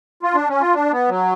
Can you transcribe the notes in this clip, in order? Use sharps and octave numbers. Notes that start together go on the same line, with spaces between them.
F4
D4
C#4
F4
D4
B3
F#3